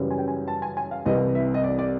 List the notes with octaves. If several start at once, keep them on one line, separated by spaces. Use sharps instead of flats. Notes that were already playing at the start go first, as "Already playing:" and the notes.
Already playing: F#2 C#3 E3 G3
G#5
G5
G#5
A5
G#5
G#5
F5
C2 C3 E3 G3 D#5
E5
D#5
D5
D5